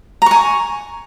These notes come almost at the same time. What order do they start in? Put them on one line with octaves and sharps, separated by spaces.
A#5 C#6 G#5